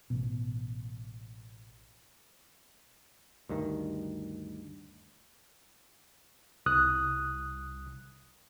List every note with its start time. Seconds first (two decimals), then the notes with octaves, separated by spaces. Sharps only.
0.10 A1 B2
3.49 D2 G2 D#3
6.66 C2 D#6 F#6